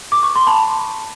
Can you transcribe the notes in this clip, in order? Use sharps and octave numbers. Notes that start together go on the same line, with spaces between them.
D6
C#6
C6
A5 B5